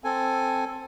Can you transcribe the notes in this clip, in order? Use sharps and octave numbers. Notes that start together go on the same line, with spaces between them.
C4 A4 G#5